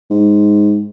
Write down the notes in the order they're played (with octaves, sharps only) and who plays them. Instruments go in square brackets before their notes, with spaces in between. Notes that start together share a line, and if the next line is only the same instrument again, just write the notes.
[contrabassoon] G#2